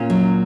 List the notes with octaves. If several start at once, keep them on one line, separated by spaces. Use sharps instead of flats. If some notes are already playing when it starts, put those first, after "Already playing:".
Already playing: A#2 C#4
F#3